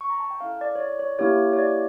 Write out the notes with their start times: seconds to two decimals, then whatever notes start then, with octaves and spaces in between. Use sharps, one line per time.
0.01 C#6
0.10 A#5
0.20 A5
0.30 G5
0.41 C#4 E4 A4 F5
0.61 D5
0.75 C#5
0.80 D5
0.99 C#5
1.19 A#3 C#4 E4 G4 C#5
1.53 C#5
1.59 D5